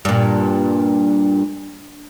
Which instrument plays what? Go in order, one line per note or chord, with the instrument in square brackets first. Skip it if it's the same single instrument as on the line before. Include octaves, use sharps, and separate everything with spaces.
[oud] G2 A#2